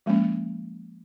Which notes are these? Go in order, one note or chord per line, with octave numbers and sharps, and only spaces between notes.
F3 G#3 A#3 C#4